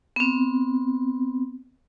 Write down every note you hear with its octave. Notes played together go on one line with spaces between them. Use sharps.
B3 C4